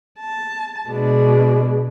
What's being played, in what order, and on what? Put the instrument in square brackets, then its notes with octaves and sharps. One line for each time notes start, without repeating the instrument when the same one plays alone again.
[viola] A5
[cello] B2 [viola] G#3 D4